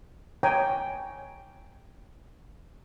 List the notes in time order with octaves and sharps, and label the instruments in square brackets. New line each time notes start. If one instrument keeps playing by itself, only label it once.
[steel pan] C#5 G5 G#5 A#5